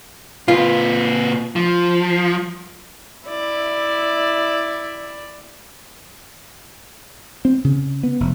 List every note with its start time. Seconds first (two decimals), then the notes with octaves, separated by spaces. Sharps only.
0.48 A#2 F4 B4
1.56 F3
3.27 E4 D5 E5
7.45 C4
7.64 C#3
8.03 B3
8.20 F1